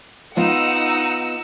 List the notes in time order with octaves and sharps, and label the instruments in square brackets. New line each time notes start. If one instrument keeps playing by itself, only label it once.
[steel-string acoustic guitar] B3 F4 [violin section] D#4 F#5 E6